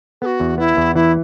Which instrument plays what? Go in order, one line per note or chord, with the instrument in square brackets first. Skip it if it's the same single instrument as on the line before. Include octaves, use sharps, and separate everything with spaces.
[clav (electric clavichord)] B3 [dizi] F#4 A4
[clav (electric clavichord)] E2
[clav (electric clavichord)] B3 [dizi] E4
[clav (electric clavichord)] E2
[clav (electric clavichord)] E3 [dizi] E4